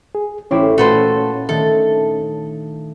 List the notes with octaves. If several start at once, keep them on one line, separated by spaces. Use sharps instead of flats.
G#4
A1 C#4 E4 G4 C5 C#5
A#2 A3 F#4 A4 B4 C5
D#3 A3 D4 A4